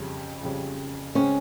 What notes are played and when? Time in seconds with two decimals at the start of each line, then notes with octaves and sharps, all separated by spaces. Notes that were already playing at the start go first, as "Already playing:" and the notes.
Already playing: F2 C#3 G3 C#4
0.43 F2 C#3 G3 C#4
1.15 C#3 G#3 C4 C#4